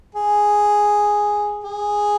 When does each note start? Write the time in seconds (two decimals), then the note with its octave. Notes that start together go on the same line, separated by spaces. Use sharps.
0.15 G#4
1.64 G#4